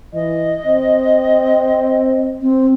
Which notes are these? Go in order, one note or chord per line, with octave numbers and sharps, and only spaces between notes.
E3 D#5
C4
C4